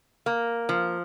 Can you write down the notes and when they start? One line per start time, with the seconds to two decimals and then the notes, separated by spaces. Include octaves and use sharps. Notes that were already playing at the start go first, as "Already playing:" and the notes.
0.26 A#3
0.69 F3